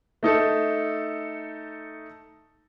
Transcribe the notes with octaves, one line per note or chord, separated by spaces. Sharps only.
A3 D#4 A4